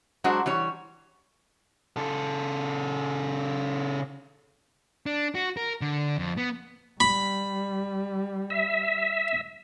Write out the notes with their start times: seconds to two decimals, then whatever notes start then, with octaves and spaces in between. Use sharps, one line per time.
0.24 F#3 G#3 D4 F#4 C5
0.46 E3 G3 C#5
1.97 C#3 A4
5.06 D4
5.35 F#4
5.57 A#4
5.81 D3
6.18 F2
6.37 B3
7.00 G3 B5
8.50 E5